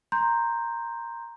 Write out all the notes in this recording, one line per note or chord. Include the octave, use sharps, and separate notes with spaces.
A#5 C6 G6